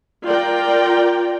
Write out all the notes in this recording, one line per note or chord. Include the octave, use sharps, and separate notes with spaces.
F4 A#4 D5 G5